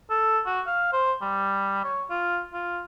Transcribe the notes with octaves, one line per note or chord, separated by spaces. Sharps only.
A4
F#4
F5
C5
G3
C#5
F4
F4